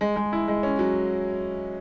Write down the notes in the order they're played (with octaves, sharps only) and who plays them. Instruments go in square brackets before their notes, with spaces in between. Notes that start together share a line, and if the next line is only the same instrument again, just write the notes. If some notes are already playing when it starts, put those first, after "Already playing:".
[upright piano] G#3
G#3
E4
G#3
C#4
F#3